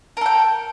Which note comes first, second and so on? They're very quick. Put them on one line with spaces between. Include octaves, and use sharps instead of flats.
A#4 A4 G5